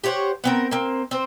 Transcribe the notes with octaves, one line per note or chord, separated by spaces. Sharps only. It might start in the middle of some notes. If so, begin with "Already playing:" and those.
G4 C5 C#5 F#5
B3 C4 A#4
A#3 C4
C4 C5